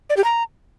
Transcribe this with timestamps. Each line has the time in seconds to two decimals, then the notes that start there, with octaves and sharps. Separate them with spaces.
0.10 D5
0.17 G4
0.24 A#5